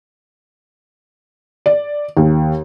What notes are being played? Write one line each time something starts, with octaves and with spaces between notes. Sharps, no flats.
D5
D#2